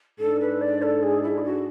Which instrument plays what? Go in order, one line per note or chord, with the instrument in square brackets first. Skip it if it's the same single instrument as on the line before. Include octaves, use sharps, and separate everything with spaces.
[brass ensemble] G#2 G#3 D4 [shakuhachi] A4
[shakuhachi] B4
D5
A4
G#4
E4
G#4
F#4